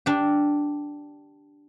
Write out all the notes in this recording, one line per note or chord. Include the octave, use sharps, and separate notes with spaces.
D4 G4